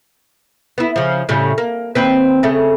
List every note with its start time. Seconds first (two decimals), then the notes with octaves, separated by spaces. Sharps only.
0.78 B3 E4
0.96 C#3 F3
1.29 A2 C#3 G3
1.58 A#3
1.95 D#2 C4 B4
2.43 C#3 A3